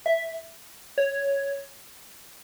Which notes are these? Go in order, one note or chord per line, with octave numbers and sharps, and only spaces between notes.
E5
C#5